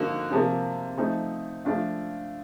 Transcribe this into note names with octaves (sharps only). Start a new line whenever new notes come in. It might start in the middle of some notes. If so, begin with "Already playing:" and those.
Already playing: D3 F3 A#3 D#4 F#4
C3 F3 A#3
F3 A3 C4 D#4
F3 A3 D4 F4